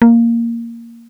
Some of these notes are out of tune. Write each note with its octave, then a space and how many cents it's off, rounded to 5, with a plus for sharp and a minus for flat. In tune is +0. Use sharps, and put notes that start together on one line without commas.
A#3 -5